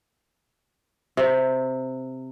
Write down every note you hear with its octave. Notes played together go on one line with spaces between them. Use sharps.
C3